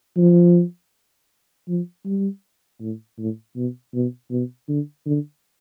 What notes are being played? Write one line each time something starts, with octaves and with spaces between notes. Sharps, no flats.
F3
F3
G3
A2
A2
B2
B2
B2
D3
D3